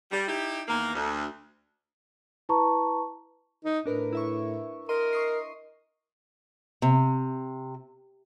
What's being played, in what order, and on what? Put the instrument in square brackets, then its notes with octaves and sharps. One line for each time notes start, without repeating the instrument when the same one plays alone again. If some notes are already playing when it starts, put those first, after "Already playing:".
[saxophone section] G3
D#4 E4 G4
E2 D#3 A#3
D2
[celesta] E4 B4 A5 A#5 C#6
[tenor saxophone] D#4
[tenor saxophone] A2 [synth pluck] D4 A#4 B4
[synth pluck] E4 E5 C#6
[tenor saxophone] A#4 [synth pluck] D#5 C6 D#7
[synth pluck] C#6 D#6 C7
[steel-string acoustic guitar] C3